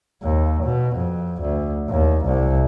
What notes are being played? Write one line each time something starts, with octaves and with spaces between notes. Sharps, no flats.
D#2
B2
F2
D2
D#2
C2